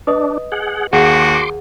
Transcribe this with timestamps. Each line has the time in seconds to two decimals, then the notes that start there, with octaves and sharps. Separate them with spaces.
0.07 D4 B4 D#5 D#6
0.52 G#4 F#5
0.93 D#2 F#4 G#4 F5 F#5 C6 D6